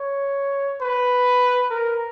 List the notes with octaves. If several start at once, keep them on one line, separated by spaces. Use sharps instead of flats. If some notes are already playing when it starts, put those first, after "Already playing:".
Already playing: C#5
B4
A#4